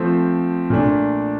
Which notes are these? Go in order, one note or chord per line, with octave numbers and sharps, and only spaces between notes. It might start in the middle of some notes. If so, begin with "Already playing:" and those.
Already playing: F3 A3 C4
A#2 A3 D4